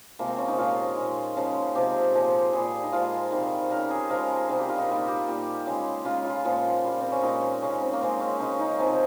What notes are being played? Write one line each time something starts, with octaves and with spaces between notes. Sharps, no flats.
C3 F3 G#3 A#3
C4
C#4
D#4
A#2 F3 G#3 F4
A#2 G#3
C#3 F3 G#3
C3 F3 G#3 G4
A#2 F3 G#3
A#2 G3 G#4
D#4
A#2 F3 G#3 F4
C3 D#3 G3
C#3 G3 A#4
G#4
C#3 F3 G#3 A#4
C3 D#3 G3 G#4
G4
F4
D#4
A#2 G3 F4
G4
A#2 G3
C#3 G#3
C#3 G#3 F4
F4
A#2 F3 G#3
A#2 G3
C4
C#4
A#2 G#3 D#4
C#3 G#3 C#4
C4
A#3
C#3 G#3 C4
C#4
C#3 G#3 D#4
D#4
C3 F3 G#3 C4